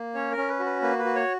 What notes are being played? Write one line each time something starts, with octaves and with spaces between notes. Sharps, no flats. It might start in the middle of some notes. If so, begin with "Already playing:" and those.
Already playing: A#3
C#4 C#5
A#4
C#4
B4
F#4
B4
A#3 B4
B4
F#4
C#5